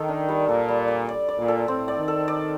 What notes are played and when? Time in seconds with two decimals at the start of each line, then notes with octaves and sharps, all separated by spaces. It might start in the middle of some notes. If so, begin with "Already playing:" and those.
Already playing: D#3 A4
0.08 D4
0.29 G3
0.48 A#2 A4
0.68 G3
0.88 D5
1.09 D5
1.29 D5
1.38 A#2
1.48 A4
1.68 A2 C4
1.88 D5
1.98 D#3
2.08 A4
2.28 D5